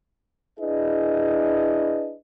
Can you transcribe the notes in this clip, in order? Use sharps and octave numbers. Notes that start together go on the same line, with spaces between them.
D4 E4 G#4 B4 D#5